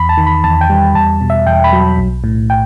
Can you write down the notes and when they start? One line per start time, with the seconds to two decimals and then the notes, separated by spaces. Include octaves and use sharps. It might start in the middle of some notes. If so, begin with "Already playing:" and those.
Already playing: E2 B5
0.09 A5
0.18 D#3
0.27 B5
0.44 E2 A5
0.61 G5
0.70 G3
0.95 E2 A5
1.21 B2
1.30 E5
1.47 E2 G5
1.64 B5
1.73 F#3
1.98 B1
2.24 A2
2.50 G5